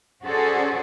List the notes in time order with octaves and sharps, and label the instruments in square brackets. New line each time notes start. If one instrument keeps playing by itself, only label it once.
[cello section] C#4 F#4 G#4 A4 C5 D5